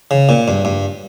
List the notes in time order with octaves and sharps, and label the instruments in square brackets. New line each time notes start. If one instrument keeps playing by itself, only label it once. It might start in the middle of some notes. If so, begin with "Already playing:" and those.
[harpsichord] C#3
A#2
G2
G2